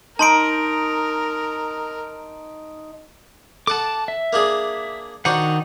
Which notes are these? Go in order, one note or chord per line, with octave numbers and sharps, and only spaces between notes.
D#4 A#4 A5 C6 D7
A4 F#5 A5 D6
E5
A#3 D4 G#4
D#3 D4 D#4 F#4 C5 F#5